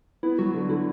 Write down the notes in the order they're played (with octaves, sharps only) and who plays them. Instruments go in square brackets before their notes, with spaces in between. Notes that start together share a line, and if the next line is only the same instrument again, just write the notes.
[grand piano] B3 [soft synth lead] E4
[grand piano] F#3 [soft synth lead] F#4
[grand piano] D3 [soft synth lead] F#4
[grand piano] D3 [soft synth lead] E4